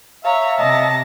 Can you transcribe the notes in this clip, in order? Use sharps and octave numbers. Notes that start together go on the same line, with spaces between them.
C#5 E5 F5 A#5
C3 D#5 A5 A#6